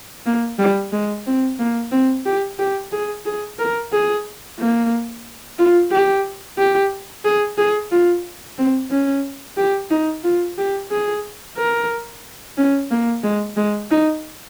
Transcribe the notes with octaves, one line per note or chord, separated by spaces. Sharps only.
A#3
G3
G#3
C4
A#3
C4
G4
G4
G#4
G#4
A#4
G#4
A#3
F4
G4
G4
G#4
G#4
F4
C4
C#4
G4
D#4
F4
G4
G#4
A#4
C#4
A#3
G#3
G#3
D#4